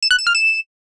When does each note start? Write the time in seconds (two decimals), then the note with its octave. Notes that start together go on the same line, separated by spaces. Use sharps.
0.03 E7
0.11 F#6
0.19 E7
0.27 F6
0.35 E7